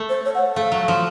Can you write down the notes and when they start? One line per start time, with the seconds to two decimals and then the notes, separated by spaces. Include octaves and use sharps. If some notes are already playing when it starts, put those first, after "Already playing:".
Already playing: A3
0.09 C5
0.25 C#5
0.35 F#5
0.56 A3 F5
0.72 F#3
0.88 F3